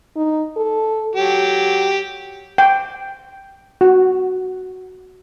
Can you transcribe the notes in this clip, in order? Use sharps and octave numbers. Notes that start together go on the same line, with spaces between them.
D#4
A4
F#3 G4
G5
F#4